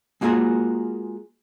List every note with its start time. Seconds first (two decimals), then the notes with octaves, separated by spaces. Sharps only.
0.21 G#3 A#3 F4 F#4 G#4 A#4